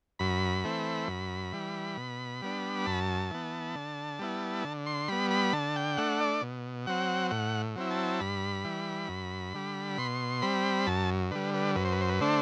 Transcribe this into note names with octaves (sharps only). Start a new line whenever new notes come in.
F#2 B5
E3 A3 C4
F#2
E3 G3
B2
G3 B3 D4
F#2 A5
E3 B3
D3
G3 B3 E4
D3
C6
G3 B3 B5
B5
D3 A5
G5
A3 D4 F#5
D5
B2
F#3 C4 F#5
A2 F#5
F#3 C4 E4
A5
G2 B5
E3 G3
F#2
D3 G3
B2 C6
G3 C4 B5
F#2 A5
D3 G3 B4
B4
F#2 B4
C5
B4
C5
B4
D3 A3 D4 C5